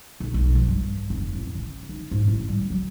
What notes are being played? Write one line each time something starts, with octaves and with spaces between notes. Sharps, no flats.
B1
B1
F3
G2
F1
A1
C#3
D#4
G#2
A1
G3
F#3